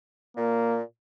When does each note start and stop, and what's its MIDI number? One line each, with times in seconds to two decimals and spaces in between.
0.37 0.83 46
0.37 0.81 58